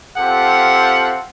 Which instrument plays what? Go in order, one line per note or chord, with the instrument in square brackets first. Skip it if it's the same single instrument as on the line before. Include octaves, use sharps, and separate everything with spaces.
[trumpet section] C4 F4 G4 A4 F5 F#5